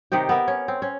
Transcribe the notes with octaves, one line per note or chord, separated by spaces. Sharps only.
C3 D#3 D#4 G4
B3 A#4 E5
C#4
C4
C#4